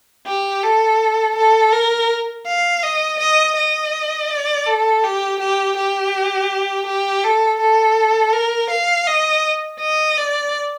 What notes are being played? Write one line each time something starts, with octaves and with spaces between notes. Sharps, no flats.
G4
A4
A4
A#4
F5
D#5
D#5
D#5
D5
A4
G4
G4
G4
G4
A4
A4
A#4
F5
D#5
D#5
D5